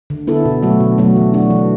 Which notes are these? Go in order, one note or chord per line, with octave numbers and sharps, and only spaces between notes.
D3
B3 E4 A4
B2
F#3 A3 F#4
B2
F#3 A3 F#4
E3
D4 F#4
E3